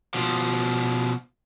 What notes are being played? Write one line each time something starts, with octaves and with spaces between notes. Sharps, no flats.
B2 F3